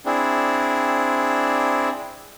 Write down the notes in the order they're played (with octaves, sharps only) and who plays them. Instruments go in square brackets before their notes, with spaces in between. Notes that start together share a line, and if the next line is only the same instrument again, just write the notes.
[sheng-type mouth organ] C4 D4 E4 G#4